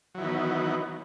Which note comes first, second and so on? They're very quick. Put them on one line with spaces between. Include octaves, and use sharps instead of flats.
F#3 E3 D#3 B3